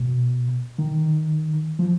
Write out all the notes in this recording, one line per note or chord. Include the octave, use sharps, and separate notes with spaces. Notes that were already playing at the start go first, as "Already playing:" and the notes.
Already playing: B2
D#3
F3